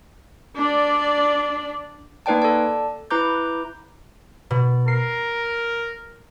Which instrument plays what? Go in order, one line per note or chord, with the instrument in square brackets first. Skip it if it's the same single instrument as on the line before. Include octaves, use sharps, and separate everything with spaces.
[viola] D4 D5
[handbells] A#3 D#4 B4 D5 G5 A5
A4 D5 A5
E4 B4 A#5 D6 G6
[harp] B2
[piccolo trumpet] A#4 [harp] C7